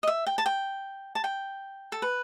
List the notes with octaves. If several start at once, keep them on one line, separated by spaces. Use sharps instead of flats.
D#5
E5
G5
A5
G5
A5
G5
A4
B4